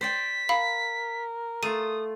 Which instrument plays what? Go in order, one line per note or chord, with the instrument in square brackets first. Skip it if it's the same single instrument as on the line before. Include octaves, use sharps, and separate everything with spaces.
[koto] C5 D5 G5 [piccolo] B6
[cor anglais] A#4 [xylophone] F5 B5
[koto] A3 F4 [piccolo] D#6 [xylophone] D#7